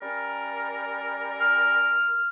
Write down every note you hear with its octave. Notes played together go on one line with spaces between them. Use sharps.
G3 C#4 A#4
F6